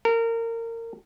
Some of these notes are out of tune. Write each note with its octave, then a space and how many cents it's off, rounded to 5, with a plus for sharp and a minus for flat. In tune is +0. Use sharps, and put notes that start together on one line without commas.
A#4 -25